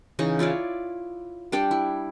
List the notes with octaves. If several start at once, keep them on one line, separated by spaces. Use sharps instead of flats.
C#3 E3 D#4 C#6
E4 F4 C#5 D5
G3 D4 D5 G5
E4